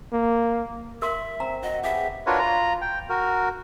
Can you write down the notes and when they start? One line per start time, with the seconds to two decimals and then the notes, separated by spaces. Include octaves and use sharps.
0.13 A#3
1.02 A#4 E5 C6
1.40 C4 A#5
1.63 F#4 D#5
1.83 G4 G#4 B4 E5
2.27 D4 F4 F#4 A#4 B4 C#5
2.39 F4 A#5
2.81 G5
3.09 F#4 A#4